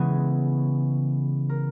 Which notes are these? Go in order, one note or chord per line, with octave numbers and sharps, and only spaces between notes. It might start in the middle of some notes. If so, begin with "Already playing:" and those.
Already playing: C#3 E3 G#3 B3 G#5
A#4